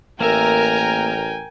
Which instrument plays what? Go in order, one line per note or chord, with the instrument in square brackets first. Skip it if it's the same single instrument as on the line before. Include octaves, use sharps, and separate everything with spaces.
[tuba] A1 [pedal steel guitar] A#3 E5 [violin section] A#4 [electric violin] G5 G#5